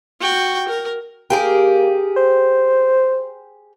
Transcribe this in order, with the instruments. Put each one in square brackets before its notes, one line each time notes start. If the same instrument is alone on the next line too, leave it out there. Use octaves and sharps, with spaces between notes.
[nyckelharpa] F#4 G5
A#4
[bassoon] A#3 [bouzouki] G4 G#4 A#4
[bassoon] C5